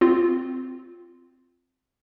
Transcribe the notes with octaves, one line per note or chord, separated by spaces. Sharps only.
C4 F4